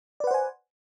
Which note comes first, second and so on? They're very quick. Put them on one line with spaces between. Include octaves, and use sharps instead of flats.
D5 B4 F#5 C5 G#5